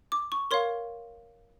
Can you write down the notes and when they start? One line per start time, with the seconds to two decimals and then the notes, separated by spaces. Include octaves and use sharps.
0.12 D6
0.32 C#6
0.51 A#4 C#5 F5 C6